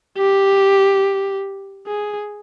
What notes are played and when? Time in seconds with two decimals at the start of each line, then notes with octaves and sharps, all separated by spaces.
0.18 G4
1.87 G#4